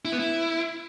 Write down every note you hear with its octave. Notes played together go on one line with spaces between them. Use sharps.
E4
B3
E4